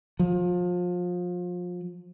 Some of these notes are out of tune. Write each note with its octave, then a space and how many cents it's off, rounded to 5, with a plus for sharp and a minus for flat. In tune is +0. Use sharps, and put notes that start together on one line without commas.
F3 +30